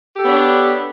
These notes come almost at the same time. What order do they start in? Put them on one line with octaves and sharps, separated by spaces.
G4 A4 B3 C#5 D4